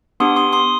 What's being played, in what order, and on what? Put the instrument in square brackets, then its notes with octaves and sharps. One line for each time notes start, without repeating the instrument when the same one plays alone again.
[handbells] B3 D4 G4 C6 D#6
C6 D#6
C6 D#6